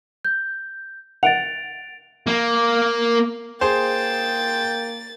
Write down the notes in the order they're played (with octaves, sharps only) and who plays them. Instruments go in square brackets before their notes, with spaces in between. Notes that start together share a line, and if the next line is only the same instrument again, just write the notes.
[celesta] G6
[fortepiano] F#5 [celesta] A6 D7 F7
[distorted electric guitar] A#3
[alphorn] A#3 [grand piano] G#4 C5 [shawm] G5 [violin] A6